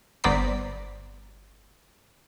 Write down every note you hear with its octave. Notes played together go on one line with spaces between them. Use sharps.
G1 B3 C5 D5 A#5 B6